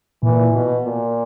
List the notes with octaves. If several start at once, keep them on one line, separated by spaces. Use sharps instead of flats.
A#2 E3
B2
A#2